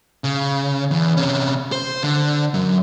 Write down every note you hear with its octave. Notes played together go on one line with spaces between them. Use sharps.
C#3
E2
C3 C#4
C5
D3
F#2